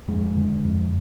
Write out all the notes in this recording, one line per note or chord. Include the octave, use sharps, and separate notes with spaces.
F2 G#3
D3
F2